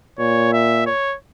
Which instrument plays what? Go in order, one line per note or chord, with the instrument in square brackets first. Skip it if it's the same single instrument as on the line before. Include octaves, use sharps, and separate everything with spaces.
[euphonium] A#2 [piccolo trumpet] C#5
[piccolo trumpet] E5
C#5